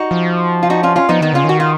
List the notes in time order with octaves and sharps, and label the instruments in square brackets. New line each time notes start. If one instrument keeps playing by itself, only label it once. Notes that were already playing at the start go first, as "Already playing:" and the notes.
Already playing: [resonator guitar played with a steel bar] D#4 F#4
[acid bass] F3
[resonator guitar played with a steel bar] F4
D#4 F#4
C#4 F4
C#4 F4
[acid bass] F3 [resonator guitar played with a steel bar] B3 D#4
[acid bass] D#3 [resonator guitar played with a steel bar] B3 D#4
[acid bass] C#3 [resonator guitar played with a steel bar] C#4 F4
[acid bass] D#3 [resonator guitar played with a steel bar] F#4
[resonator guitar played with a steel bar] F4